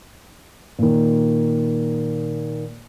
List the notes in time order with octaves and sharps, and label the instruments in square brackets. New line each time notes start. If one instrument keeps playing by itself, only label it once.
[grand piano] A#2 D#3